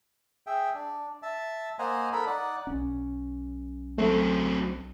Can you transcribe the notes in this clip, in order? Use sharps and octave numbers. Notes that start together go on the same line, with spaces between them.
G#4 E5 G5
D4
E5 A5
A#3 C5 D#5 F#5 G#5 A#5
D#4 A4 A#4 B5
D#4 D5 F#5
B1 C#4
F#3 A3 C4